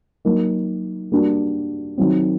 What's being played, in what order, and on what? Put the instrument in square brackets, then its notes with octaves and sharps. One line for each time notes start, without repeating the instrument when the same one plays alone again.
[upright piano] F#3 A#3 D#4
G3 A#3 D4 F#4
D#3 F#3 C4